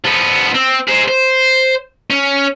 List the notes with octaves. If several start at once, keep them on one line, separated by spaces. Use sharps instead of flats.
F3 B3
C4
G#4 C5
C5
C#4